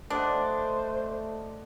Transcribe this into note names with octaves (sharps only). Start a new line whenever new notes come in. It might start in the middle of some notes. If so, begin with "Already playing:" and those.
A3 D4 C5 D5 D#5 F#5